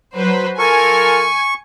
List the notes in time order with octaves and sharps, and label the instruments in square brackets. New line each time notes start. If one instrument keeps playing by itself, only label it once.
[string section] F#3 B4 C5
[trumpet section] F4 A4 A#4 [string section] G#5 [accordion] C#6